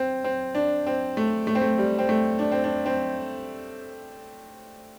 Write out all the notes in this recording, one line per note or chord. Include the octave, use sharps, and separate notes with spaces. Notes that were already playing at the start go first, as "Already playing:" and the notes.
Already playing: C4
C4
D4
C4
A3
A3
C4
A3
G3
C4
A3
D4
C4
D4
C4